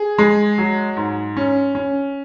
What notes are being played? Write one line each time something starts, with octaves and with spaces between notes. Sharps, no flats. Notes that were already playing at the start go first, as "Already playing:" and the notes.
Already playing: G#4
G#3
F#3
G#2
C#4
C#4